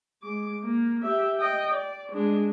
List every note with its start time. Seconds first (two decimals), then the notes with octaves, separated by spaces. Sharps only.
0.23 G#3 D6
0.64 A#3
1.03 G4 E5
1.37 D#5 G5
1.73 D5
2.12 G#3 D4